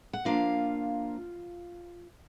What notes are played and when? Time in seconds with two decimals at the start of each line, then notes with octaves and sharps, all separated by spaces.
0.13 F#5
0.25 F3 A#3 D4 F4 F5